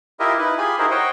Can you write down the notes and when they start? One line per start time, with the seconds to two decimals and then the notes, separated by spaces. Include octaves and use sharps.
0.20 E4 F4 G4 A#4 D#5 E5
0.39 D#4 E4 B4
0.58 F4 G4 G#4 G#5 B5
0.79 D#4 E4 F#4 G#4 A#4 C5
0.91 C5 C#5 D#5 F#5 G5